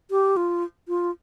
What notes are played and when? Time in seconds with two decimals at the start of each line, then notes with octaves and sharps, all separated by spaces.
0.11 G4
0.37 F4
0.88 F4